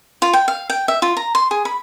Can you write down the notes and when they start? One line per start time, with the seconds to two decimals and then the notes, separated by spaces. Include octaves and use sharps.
0.22 F4
0.33 G5
0.48 F5
0.70 G5
0.88 E5
1.02 F4
1.17 A#5
1.35 C6
1.51 G#4
1.65 B5